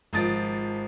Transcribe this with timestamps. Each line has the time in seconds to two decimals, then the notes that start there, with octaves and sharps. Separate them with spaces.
0.13 G#1 F3 D#6 A6 D7